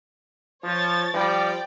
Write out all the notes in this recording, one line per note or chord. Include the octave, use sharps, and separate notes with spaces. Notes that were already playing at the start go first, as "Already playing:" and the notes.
F3 C#5 A6
F3 G3 D5 G5